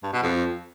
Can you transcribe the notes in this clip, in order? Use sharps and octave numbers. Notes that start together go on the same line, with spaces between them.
G2
B2
F2